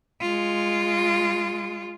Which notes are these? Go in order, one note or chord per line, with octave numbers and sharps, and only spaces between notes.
G#3 F4